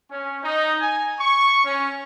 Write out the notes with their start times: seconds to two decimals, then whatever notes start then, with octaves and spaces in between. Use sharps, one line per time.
0.11 C#4
0.43 D#4
0.80 G#5
1.20 C#6
1.65 C#4